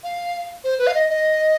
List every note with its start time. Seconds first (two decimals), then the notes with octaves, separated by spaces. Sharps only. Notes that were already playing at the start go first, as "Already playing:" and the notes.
0.03 F5
0.64 C5
0.78 B4
0.87 F5
0.94 D#5
1.10 D#5